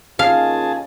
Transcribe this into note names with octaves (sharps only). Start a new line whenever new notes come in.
D#2 C#4 F4 G#4 F5 A5